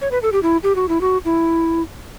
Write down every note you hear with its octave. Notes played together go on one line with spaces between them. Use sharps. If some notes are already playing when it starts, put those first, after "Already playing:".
C#5
B4
A4
G4
E4
G4
F#4
E4
F#4
E4